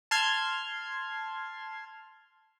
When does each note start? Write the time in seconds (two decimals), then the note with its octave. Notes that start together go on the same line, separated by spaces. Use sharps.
0.11 A5 C6 F6 G#6